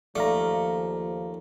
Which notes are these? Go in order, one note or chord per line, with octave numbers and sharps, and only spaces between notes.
D#2 F3 A3 D5 F5 A#5